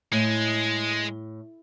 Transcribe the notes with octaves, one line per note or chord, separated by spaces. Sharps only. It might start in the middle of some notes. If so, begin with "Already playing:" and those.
A2 G#3